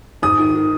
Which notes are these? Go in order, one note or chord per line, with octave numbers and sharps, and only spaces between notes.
G#2 D#6
D#3
D#3